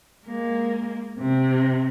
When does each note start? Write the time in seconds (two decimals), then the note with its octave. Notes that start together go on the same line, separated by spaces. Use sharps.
0.25 G#3 A#3
1.20 C3